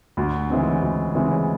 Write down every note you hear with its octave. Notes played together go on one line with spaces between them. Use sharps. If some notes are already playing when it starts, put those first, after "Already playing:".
D2
C#3 E3 G#3 C4
D2
C#3 E3 G#3 C4